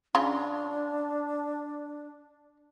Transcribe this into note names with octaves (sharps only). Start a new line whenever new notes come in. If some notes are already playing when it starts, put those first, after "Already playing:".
C#3 D4 F4